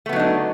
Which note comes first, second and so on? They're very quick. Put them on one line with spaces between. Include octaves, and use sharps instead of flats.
A3 B3 F#3 D#4 D4